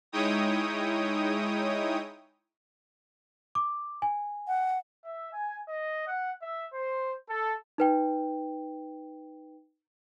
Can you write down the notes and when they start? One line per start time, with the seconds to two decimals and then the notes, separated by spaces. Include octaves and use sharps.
0.12 G#3 D#4 E4 C#5 G5 D#6
3.55 D6
4.02 G#5
4.48 F#5
5.05 E5
5.34 G#5
5.69 D#5
6.08 F#5
6.42 E5
6.73 C5
7.28 A4
7.78 D#4 B4 G5